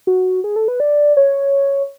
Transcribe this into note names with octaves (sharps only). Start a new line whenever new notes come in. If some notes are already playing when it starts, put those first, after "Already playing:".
F#4
G#4
A4
B4
D5
C#5